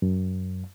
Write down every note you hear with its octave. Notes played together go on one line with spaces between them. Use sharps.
F#2